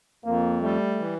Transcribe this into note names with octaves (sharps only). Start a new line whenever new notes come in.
F2 A#3
G3 A3
E3